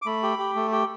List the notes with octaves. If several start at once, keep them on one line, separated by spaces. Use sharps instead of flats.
D6
A3 B5
G4
G4
A3
G4